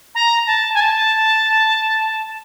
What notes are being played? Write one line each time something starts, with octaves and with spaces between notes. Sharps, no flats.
A#5
A5
G#5
A5